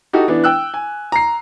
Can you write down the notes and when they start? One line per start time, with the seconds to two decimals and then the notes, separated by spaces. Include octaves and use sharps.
0.13 D#4 F#4 G4 A4
0.28 E3 B3 D4
0.44 G5 E6 F#6
0.74 G#5
1.12 A#5 C7